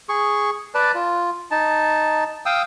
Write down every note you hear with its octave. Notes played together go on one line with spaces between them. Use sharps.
G#4 C#6
B4 D5 A5
F4
D#4 A5
F5 G5 D#6 E6